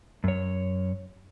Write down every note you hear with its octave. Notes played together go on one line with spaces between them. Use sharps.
F#2 C#5